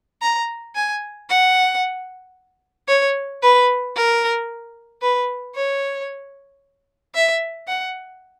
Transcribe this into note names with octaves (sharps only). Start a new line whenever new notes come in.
A#5
G#5
F#5
C#5
B4
A#4
B4
C#5
E5
F#5